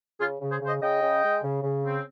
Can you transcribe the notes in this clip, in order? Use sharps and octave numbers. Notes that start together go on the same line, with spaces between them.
C#3 F4 G#4
C#3
G#4 C5
C#3
C5 D#5
C#3 D#5 G5
C#3
G#3
C#3
C#3
C4